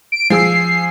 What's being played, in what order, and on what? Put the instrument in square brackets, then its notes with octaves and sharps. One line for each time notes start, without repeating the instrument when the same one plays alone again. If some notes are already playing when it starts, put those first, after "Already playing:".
[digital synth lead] D7
[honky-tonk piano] F3 G#4 E6 [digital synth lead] C7